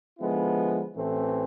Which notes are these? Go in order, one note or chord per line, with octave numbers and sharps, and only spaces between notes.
D3 F3 G#3 B3 E4
A1 A2 E3 A3 C4